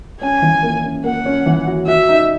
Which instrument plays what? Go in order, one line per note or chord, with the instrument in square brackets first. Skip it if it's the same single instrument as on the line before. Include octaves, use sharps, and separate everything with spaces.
[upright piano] C#4 [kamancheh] G#5
[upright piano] E3
A#3
C#4
[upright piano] A#3 [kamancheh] F#5
[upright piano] C#4
E3
F#4
[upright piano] F#4 [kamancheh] E5
[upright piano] D#4